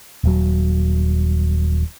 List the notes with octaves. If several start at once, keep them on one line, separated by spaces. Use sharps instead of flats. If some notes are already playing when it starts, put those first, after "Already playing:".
D#1 F#3